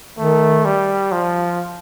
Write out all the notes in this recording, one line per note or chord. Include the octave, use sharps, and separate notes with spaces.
D#3 A3
G3
F3